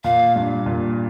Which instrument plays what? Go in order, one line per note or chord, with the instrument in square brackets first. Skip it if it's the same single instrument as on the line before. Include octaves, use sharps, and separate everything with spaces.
[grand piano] A#2 [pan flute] F5
[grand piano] G2
A#2